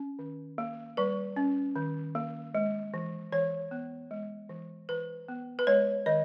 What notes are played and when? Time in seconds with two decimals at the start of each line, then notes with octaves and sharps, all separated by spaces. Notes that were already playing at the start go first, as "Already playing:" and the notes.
Already playing: C#4
0.19 D#3
0.58 A#3
0.97 G3 B4
1.36 C#4
1.76 D#3
2.15 A#3
2.55 G#3
2.94 E3
3.32 E3 C#5
3.71 B3
4.11 G#3
4.49 E3
4.89 E3 B4
5.28 B3
5.59 B4
5.67 G#3 C#5
6.06 D#3 D#5